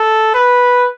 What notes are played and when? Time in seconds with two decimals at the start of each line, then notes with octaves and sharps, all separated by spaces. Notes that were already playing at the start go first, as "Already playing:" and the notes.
Already playing: A4
0.34 B4